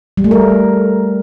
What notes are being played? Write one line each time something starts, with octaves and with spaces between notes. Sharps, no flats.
G3
A3
A#4